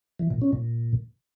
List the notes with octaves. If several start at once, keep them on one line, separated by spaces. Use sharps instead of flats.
E3
A#2
C#4
A#2